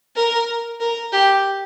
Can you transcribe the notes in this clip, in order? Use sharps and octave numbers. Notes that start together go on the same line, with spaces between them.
A#4
A#4
G4